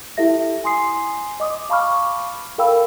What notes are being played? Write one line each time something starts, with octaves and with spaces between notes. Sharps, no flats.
E4 G4 A4 E5 A#6
G#5 C6 D#6 C7
D#5 D6 D#6
F5 A5 B5 C#6 D6 F6
A4 A#4 F5 G5 B5 E6